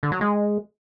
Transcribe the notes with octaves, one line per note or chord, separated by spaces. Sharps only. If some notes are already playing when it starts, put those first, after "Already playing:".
D3
F#3
G#3